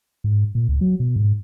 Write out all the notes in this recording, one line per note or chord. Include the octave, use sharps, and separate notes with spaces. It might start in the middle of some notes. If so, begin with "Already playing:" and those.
G#2
A#2
C#2
F#3
B2
G#2